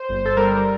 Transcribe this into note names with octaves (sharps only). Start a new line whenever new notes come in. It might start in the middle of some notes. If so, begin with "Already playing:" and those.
Already playing: C5
G1
A4
G3 A#4